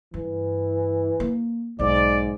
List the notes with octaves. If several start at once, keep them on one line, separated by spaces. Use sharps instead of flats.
G2 E3
A#3
B1 G#2 D5